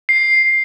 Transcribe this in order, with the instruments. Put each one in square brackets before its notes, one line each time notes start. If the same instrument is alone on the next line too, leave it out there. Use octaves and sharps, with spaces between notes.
[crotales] C7